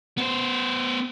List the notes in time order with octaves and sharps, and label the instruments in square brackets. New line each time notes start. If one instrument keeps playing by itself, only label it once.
[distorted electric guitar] B3 C5